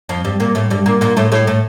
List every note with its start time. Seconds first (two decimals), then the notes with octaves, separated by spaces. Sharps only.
0.09 F2 F3
0.25 G2 G3
0.40 A#2 A#3
0.55 A2 A3
0.70 G2 G3
0.86 A#2 A#3
1.01 A#2 A#3
1.17 A2 A3
1.32 A2 A3
1.47 A2 A3